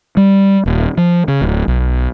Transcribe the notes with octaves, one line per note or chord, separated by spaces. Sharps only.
G3
D#1
F3
C#3
D1
B1